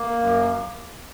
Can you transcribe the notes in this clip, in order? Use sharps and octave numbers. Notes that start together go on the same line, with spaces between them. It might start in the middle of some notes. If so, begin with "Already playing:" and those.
Already playing: A#3
F#2